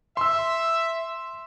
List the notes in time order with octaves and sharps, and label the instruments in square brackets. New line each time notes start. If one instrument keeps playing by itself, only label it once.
[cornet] E5 [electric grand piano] C6 E6